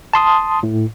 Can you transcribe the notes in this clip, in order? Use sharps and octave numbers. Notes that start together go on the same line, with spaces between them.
A5 C6 D#6
A2